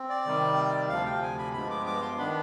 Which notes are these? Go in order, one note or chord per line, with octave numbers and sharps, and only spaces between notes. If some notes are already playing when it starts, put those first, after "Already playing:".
Already playing: C4
D5
C3 D#3 G3
D2 C3 F3 F5
G5
G#5
B5
G2 F3 G#3 B3 B5
D6
D6
C6
D#3 B3 D4 B5